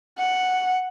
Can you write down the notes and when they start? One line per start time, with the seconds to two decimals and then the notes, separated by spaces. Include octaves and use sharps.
0.18 F#5